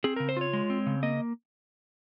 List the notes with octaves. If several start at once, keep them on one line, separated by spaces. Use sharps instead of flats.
C4 G#4
C#3 A#4
C5
F4 C#5
G#3
C4
C#3
A#3 D#5